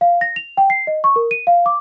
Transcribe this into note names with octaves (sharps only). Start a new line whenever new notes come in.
F5
A#6
F7
G5
C7
D#5
C#6
A#4
D#7
F5
D6